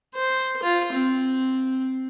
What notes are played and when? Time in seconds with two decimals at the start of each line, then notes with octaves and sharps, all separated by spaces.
0.15 C5
0.63 F4
0.93 C4